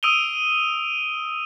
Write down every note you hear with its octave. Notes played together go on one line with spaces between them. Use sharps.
D#6 E6 D7 D#7 F7 G7